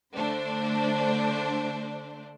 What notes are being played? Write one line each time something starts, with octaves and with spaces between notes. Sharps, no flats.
D3 A3 D4 C5